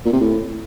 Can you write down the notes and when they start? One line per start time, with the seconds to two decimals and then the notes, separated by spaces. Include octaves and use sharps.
0.05 A#2
0.13 C3
0.21 A2